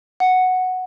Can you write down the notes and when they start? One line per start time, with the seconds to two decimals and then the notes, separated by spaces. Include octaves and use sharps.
0.20 F#5